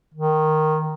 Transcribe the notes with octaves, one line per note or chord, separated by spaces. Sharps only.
D#3